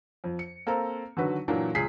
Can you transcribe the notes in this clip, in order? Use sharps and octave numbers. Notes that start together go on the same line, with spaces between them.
F2
C#7
A#3 C4 A4 A#5
D3 D#3 F#3 F#4 B4
A#2 E3 F#3 A#3 D4
C#2 G#4 B6 C7